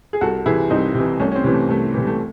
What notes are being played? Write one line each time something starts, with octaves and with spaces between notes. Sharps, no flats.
G#4
C2 F#4 A4
C3 E3 E4 G#4
C2 C4 D#4
C3 E3
C2 A3 C#4
C#4
C4
C3 E3
A3
C2 A3
C3 E3
A3